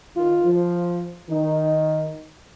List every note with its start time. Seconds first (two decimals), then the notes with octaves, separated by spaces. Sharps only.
0.16 D#3 F4
0.44 F3
1.30 D#3 D#4